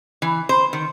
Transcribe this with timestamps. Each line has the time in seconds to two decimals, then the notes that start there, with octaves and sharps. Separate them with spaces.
0.22 E3
0.49 C5
0.73 D#3